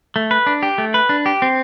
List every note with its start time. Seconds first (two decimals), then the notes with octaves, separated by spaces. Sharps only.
0.16 A3
0.31 B4
0.47 D4
0.63 G4
0.78 A3
0.94 B4
1.09 D4
1.26 G4
1.42 C4